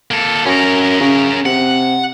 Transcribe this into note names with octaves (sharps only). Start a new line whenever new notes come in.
A#3 A4
F#2 C#4 A#4
C#3
C3 F#5